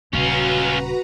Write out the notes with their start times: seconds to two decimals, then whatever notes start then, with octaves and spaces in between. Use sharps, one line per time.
0.13 D#1 C#3 C#4 F4 F#4 B4 A#5